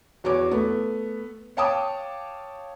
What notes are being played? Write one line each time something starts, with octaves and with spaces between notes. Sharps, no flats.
E2 F#4 C#5 D6
A3 B3
C#5 F5 G5 A5 D6 D#6